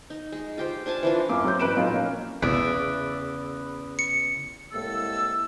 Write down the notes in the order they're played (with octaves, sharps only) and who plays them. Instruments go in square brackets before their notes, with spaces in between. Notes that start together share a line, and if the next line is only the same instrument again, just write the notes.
[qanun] D#4
G#3
F4 G4 C5
D4 C5 G#5 A5
E3 F3 D4
[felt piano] F#2 A#3 D6
F#3 C4 C#4 C5 D6 G6
A1 B4 D7 E7
A#2 F3 F#3 D#4 F4 A4
A#3 C#4
[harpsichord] E2 [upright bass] C#3 [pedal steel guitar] B4 D5 E5
[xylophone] C#7
[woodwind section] C2 A2 G#3 A#3 A4 E6